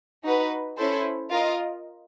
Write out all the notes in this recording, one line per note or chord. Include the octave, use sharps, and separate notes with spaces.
D#4 F#4 B4
C#4 E4 A4 C5
F4 A#4 D#5